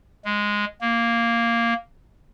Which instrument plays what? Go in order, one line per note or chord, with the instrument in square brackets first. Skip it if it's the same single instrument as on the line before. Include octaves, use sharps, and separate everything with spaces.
[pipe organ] G#3
A#3